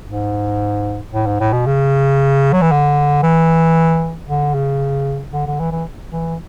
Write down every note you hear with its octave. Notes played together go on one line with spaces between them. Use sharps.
G#2
A2
G#2
A2
B2
C#3
F#3
E3
D3
E3
D3
C#3
D3
D3
E3
E3
E3